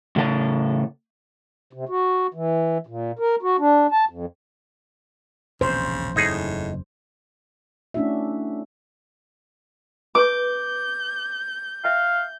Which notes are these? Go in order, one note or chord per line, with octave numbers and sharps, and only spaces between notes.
A2 C#3 A4 B4 A5
C3
F#4
E3
A#2
A#4
F#4
D4
A5
F2
E1 A#1 D#2 C#3 C5
F#1 E2 A2 D#4 G#4
A3 C#4 D4 E4 F#4 E5
B4 D6 G6
E5 F5 G5